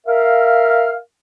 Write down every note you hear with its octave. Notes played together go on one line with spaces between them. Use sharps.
A#4 E5 F5